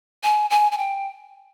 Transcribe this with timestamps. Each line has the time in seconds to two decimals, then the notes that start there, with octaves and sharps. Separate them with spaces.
0.24 G#5
0.50 G#5
0.72 G#5
0.78 G5